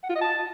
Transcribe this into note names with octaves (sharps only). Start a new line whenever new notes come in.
F#5
F4
D#5
A5